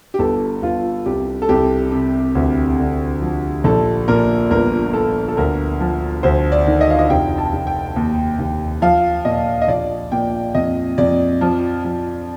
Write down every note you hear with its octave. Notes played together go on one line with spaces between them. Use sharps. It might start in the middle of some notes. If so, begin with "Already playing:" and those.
G4
G1 A4
G1 F4
C2 G4
A4
C2 G4
C3
D2
D3
F3
A#1 A4
A#2 A#4
G1 A#4
G1 A4
A4
D2 A#4
F3
D2 C5
D5
D#3
D#5
F5
D#5
F1 G5
A5
F1
G5
D#2
D#2
F3 F5
A#2 D#5
D#5
A#1 D5
A#2 G5
F2 D#5
F2 D5
F3
F3